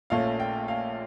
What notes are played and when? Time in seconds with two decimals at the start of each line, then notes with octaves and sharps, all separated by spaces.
0.10 A#1 A#2 A3 C#4 F5
0.40 G5
0.68 F5